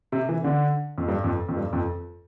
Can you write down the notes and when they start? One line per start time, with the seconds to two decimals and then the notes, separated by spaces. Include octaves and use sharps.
0.12 C3
0.29 E3
0.44 D3
0.98 F2
1.08 G2
1.24 F2
1.49 F2
1.56 G2
1.73 F2